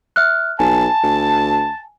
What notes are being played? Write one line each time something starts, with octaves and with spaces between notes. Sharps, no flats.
E5 F6 F#6
B1 G#5 A5
D2